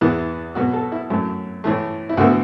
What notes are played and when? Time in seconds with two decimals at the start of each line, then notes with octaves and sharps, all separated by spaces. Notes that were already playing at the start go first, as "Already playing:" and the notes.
0.01 E2 E3 B3 E4
0.55 B2 F#3 B3 F#4
0.73 A4
0.92 E4
1.10 F#2 F#3 A3
1.64 A2 E3 A3
2.09 E4
2.17 D2 D3 B3 F#4